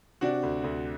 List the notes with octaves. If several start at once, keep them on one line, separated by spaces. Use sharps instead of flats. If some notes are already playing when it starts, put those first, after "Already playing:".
C3 D4 F#4
D2
D2